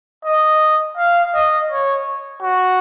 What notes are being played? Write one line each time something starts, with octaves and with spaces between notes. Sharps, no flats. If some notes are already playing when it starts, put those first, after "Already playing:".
D#5
F5
D#5
C#5
F#4